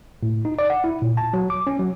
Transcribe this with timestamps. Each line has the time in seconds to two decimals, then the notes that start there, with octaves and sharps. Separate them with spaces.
0.23 A2
0.45 D#4
0.59 D5
0.70 F#5
0.84 E4
1.02 A#2
1.17 A5
1.33 F#3
1.50 D6
1.67 C#4
1.79 F#3